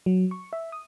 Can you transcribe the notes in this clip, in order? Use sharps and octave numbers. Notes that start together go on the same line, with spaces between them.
F#3
C#6
E5
D#6